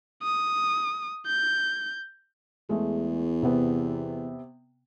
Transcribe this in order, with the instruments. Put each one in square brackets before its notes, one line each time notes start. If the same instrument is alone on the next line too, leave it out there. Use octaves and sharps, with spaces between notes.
[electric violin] D#6
G6
[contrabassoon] E2 [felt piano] G#3 A3
[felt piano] C3 B3